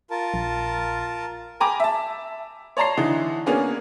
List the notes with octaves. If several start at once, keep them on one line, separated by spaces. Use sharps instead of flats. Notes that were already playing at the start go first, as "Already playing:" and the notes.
F4 A#4 A5
A#1
G5 G#5 A#5 B5 D6
E5 A5
C#5 D5 A5 A#5 C6 C7
D3 E3 D#4
A#3 B3 C#4 D4 G#4